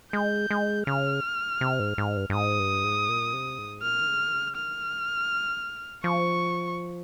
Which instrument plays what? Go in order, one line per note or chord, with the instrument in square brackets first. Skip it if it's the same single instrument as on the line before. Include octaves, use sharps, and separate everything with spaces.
[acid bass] G#3 [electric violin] G6
[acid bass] G#3
[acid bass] C#3 [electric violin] F6
[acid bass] C3
G#2
G#2
G2
G2
[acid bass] G#2 [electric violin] D#6
[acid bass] G2
G#2
A#2
C3
G#2
[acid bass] A#2 [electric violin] F6
[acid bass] D#3
C#3
D#3
C#3
[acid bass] D#3 [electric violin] F6
[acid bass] F3 [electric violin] C#6